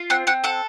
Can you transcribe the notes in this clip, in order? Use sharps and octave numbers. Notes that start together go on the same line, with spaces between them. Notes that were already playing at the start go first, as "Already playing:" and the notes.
Already playing: F4
C4 F#5
C4 F#5
A4 F#5